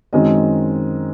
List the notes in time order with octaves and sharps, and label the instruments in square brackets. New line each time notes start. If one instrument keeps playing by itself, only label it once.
[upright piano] F#2 D#3 G#3 C4 D#5